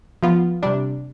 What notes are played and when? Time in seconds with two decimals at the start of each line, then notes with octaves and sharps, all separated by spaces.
0.23 F3 B3 F4
0.63 C3 G3 D4